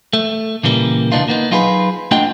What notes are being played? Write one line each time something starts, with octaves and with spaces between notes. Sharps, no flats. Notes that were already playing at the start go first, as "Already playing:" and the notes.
A3
A#2 C#3 E3 G3 A3 A#3
D2 B2 B3 D4 D#4 F4
A#3 B3 D#4
F#3 D#4 F4 G#4 A#4 B4
A3 D4 F4 D#5 F#5 G5